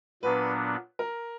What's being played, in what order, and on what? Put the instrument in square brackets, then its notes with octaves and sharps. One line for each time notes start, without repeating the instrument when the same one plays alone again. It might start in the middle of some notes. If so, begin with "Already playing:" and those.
[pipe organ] A#2 F#3 B3 D4 [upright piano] B4
[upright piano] A#4